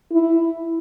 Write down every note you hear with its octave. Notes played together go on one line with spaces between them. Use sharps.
E4